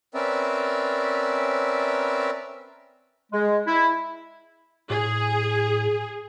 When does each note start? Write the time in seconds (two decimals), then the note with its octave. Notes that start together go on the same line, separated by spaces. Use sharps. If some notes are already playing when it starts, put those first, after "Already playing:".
0.14 C4 C#4 A#4 B4 D5 E5
3.32 G#3
3.67 E4
4.90 A2 G#4